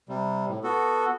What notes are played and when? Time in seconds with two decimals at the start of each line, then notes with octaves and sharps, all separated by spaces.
0.09 C3 G3
0.49 A2
0.64 B3 F#4 A4